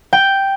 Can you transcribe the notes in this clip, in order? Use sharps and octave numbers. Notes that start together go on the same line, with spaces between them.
G5